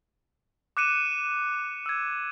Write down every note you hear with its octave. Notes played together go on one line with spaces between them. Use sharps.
D6 F#6 C#7 D#7 E7
E6 G#6